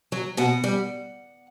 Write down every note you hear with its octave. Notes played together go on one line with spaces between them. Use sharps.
F#3
B2 F#5
G3